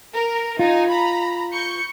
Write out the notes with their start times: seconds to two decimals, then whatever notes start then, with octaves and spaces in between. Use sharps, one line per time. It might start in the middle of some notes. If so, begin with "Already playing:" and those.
0.14 A#4
0.59 D#4 F4 G#5
0.91 A#5 B5
1.54 C#6 G6 C#7